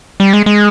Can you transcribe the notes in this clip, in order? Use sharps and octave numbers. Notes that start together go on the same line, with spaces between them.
G3
G#3
G#3